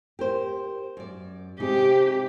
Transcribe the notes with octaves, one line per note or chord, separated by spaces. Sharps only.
G4 A#4 C5
F#2 D5
C3 G#3 D#4 G4